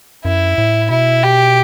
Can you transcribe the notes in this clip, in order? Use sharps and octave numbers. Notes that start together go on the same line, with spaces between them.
F#2 E4
A2
B2 E4
G4